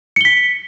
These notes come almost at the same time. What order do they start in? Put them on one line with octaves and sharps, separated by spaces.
C#7 G7 B6